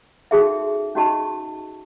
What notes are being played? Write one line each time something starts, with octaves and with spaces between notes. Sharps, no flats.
C#4 D#4 F#4 G#4 A4 E5
C#4 D#4 F#4 D#5 A5 C#6